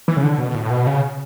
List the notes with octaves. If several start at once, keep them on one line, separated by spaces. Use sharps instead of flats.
E3
C#3
D3
B2
A2
B2
C#3